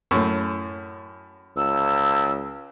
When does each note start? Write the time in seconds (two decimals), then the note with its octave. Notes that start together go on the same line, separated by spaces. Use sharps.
0.11 F#2 A2
1.57 C#2 E6